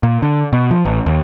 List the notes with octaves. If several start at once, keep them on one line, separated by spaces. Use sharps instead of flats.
A#2
D3
B2
F3
A1
D#2